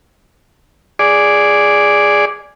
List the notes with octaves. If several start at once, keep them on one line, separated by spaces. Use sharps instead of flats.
G#4 D5